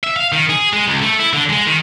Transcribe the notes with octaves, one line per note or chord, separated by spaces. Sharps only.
E5
F5
D#3
G#4
G#3
C#2
A3
E4
D3
G#3
D#3